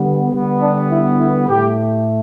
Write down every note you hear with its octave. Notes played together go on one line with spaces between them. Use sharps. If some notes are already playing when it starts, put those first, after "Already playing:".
Already playing: D3 G3 B3
D3 G3 B3
D4
E4
E4
A2 A3 G4